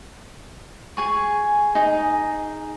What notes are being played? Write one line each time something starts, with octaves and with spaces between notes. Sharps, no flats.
G#4 G#5 C#6
D#4 G#4